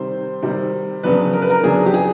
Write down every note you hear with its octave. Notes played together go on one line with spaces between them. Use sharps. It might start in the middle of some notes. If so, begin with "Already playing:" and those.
Already playing: C3 D#3 G3 C4 C5
C3 D#3 G3 C4
F2 C#3 F#3 B3 D4 B4
A#4
B4
A#4
F2 C#3 F#3 B3 D4 G#4
G4
G#4